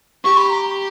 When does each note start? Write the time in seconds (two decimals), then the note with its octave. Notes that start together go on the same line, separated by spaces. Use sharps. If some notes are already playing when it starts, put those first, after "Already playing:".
0.24 G4 C#6
0.36 B5
0.50 A#5